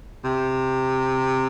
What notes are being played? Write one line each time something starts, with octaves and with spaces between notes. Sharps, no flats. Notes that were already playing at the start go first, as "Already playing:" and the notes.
C3